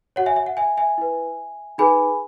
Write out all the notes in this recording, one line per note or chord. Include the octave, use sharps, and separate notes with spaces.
F#4 C#5 F#5
E5 G#5
E5
F#5
E5 G#5
E5 G#5
E4 B4
D#4 G#4 B4 G#5 B5